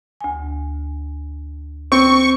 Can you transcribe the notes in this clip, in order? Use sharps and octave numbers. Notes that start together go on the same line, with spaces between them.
D2 G#5
C4 C#6